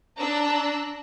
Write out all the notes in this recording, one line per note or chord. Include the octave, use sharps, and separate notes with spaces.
D4 A#5 E6 F#6